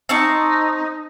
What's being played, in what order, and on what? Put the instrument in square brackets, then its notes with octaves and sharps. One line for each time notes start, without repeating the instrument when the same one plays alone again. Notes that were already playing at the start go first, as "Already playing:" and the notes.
[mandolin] C4 A5 C#6 [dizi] D#4